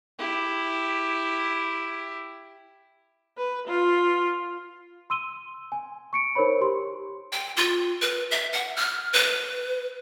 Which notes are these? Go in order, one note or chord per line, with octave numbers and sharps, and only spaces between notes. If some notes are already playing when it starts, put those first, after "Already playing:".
E4 G4
B4
F4
C6 E6 D#7 G7
G#5
C#6 C#7 D7
D#4 A#4 C5 C#5 B5
G4 C6
G5
F4
B4
E5
F#5
F6
B4